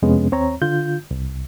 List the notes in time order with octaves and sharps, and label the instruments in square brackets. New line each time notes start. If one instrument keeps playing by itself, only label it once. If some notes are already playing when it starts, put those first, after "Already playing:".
[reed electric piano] F2 C3 G#3 B3 C#4
D#2 C4 C#5 A#5
D3 F4 G6
C2